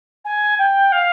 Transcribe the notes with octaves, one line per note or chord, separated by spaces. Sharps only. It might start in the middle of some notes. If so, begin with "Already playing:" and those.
G#5
G5
F5